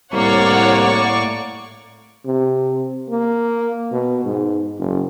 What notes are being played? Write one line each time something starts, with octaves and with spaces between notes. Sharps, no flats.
C2 A2 A#3 C#5 D5 F#5 C#6
C3
A#3
B2
G#2
F#1